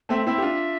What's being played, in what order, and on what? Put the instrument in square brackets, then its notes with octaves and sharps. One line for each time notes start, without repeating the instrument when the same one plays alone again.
[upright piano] A3 C4 [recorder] E5
[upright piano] C4 E4 [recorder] E5
[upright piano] G4
D4 F4